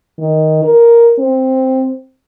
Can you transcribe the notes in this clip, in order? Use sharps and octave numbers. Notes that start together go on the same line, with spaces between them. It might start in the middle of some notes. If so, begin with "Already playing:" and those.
D#3
A#4
C4